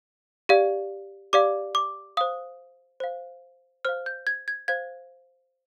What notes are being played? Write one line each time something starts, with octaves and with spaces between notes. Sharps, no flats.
G4 D5 F5
G4 D5 F5 D6
D6
C5 F5 D#6
C5 F5
C5 F5 F6
G6
G#6
G#6
C5 F5 G#6